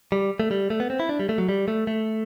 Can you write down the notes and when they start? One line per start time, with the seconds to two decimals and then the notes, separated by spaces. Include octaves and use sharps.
0.12 G3
0.40 A3
0.51 G3
0.70 A3
0.80 B3
0.90 C4
1.00 E4
1.09 D4
1.20 G3
1.29 A3
1.38 F#3
1.49 G3
1.68 A3
1.87 A3